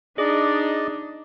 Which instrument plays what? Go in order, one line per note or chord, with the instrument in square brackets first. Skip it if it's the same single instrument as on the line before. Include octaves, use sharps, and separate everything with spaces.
[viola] D4 D#4 [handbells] G#4 [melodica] D5 D#5